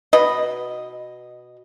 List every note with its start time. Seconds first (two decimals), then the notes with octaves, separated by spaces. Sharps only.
0.13 B2 B4 D#5